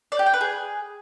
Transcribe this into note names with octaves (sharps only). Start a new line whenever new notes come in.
D5
G4
G5
B4
G#4